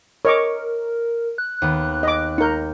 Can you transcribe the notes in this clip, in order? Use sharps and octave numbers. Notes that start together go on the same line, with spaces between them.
A#4 C#5 D#5 D6
F#6
D#2 B3
D#5 D6
D#4 A#4 G6 C#7